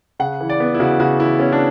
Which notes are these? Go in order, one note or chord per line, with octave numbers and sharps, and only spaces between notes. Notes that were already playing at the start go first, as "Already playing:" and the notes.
C#3 F#5
E3
D5
B3
E4
C#3 F#4
C#3 F#4
E3 E4
B3 C#4
D4